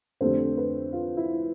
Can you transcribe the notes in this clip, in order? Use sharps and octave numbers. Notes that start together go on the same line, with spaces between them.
F2 D3 A3 C4 G4 C5
B4
F4
E4